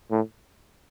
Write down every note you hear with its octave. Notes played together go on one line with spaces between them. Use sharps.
A2